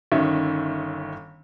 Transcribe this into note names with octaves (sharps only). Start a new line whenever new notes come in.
G1 D#3 C#4 E5